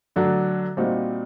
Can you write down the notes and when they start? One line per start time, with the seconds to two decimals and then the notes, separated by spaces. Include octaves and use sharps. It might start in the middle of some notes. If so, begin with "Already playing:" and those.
0.16 D3 F#3 A3 D4 F#4
0.77 A#2 G3 C4 D#4 F#4